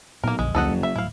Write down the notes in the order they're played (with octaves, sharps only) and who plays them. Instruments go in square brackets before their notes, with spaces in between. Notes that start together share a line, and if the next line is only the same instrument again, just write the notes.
[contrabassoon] B1 [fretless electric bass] A#2 [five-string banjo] A#3 A#4
[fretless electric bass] A#1 [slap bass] F2 D3 F3 [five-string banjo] G#3
[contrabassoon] F#1 [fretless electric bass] C#2 [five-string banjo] A4 D#5 F#5
[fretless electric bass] F#3
[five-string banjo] E5
[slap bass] D#1 D2 A2 [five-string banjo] E4 F5